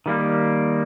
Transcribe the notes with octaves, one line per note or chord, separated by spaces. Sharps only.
D#3 G3 A#3